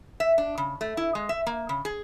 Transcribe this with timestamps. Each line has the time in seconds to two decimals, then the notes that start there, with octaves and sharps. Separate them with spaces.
0.20 E5
0.38 D4
0.58 C#3
0.81 A3
0.97 E4
1.15 G#3
1.29 E5
1.47 A#3
1.69 C#3
1.85 G#4